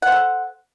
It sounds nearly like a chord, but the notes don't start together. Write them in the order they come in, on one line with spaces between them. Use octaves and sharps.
F#5 C5 A4